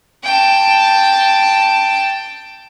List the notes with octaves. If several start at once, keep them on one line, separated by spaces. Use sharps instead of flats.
G5 A5